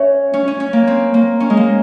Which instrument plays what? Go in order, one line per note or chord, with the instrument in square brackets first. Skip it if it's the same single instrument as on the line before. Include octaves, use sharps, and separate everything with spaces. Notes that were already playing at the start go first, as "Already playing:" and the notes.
Already playing: [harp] C#4 [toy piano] C#5 E5
[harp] C#4
C#4
C#4
A#3
C4
A#3
C#4
G#3
A#3